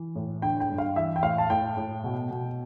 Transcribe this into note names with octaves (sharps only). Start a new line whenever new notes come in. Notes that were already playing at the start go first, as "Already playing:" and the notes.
Already playing: E3
A2
D3 G5
G5
G2
F5
E3 E5
G5
A2 F5
A5
A2 G5
A2
B2
B2